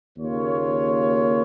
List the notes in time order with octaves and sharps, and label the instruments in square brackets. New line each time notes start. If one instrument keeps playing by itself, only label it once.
[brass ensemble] D#2 C#3 A#3 F4 C#5